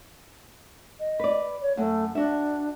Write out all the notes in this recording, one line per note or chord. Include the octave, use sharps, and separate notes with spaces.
D#5
B4 D5
C#5
F#2 A3
D4 F#4 E5